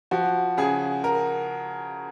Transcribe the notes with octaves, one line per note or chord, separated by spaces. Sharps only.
F3 F#4
C#3 G#4
A#4